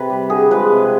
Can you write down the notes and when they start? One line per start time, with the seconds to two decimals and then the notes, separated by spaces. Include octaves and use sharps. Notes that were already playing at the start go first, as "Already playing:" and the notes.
Already playing: C3 B4
0.10 G3
0.30 D3 G#4
0.51 F3 G#3 B4
0.72 C3